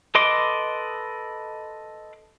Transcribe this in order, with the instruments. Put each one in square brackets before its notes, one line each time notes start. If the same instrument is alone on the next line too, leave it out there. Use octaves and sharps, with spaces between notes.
[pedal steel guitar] A4 B4 D#5 C6 D6